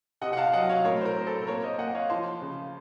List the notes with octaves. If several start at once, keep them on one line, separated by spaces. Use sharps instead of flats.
C3 D#5 F#5
F#5
F5 A5
F#3 D#5 F#5
C#5 F5
A2 A#4 C#5
C5
A#4
C4
A4 C5
A#3 A#4 C#5
C5 D#5
A#3 D#5 F#5
C#5 F5
F3 A5 C6
C#3